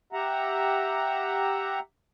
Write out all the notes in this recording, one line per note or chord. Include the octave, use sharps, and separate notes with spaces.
G4 E5 F#5 A#5